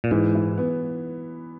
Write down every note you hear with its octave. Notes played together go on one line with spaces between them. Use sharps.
A#2
G#2 E3
E4
B3